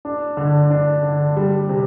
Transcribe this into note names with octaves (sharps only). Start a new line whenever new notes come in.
D4
D3
D4
D3
G3
C3